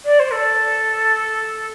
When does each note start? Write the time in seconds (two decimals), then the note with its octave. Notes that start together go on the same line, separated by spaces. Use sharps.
0.05 D5
0.19 C5
0.32 A4